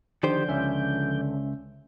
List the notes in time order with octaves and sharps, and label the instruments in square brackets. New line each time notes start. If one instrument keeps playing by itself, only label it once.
[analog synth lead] D3 [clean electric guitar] D#3 G4 C5 [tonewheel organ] F3 D5 G6
[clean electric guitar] C#2 [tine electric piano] C#4 E5